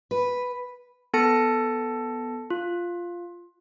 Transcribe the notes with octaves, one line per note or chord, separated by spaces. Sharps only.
B4
B3 A4 A5 A#6 C#7
F4